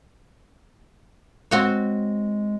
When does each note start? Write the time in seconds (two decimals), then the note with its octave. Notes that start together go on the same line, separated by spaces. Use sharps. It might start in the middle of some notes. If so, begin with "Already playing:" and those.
1.51 G#3 C4 F#4 C#5